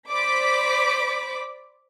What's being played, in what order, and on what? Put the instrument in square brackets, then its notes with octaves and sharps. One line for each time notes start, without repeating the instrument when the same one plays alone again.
[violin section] C5 D5 B5 D6 B6